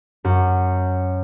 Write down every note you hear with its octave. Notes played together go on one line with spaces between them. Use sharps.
F#2